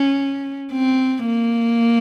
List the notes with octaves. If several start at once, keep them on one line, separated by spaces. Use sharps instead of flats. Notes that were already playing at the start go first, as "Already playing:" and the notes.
Already playing: C#4
C4
A#3